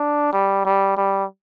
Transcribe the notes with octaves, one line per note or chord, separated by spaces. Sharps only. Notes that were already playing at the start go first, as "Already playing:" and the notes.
Already playing: D4
G3
G3
G3